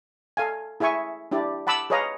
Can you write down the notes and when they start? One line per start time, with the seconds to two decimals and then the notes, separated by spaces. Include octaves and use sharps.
0.37 A4 F5 G#5
0.80 E4 G#4 E5 G#5 C#6
1.31 D4 E4 G4 D5
1.67 F#5 A5 B5 D6 E6
1.90 G#4 B4 C#5 D#5 F5 A#5